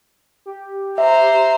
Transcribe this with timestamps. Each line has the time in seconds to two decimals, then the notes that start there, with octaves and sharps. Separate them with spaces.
0.46 G4
0.98 C5 E5 A#5